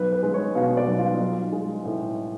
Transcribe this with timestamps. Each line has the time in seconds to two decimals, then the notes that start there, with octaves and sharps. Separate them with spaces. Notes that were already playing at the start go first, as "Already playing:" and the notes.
Already playing: B1 B4
0.12 B4
0.23 G#3
0.34 C#5
0.55 B2 F5
0.77 D5
0.88 B1
0.98 F4
1.20 B1
1.52 G#3
1.85 A2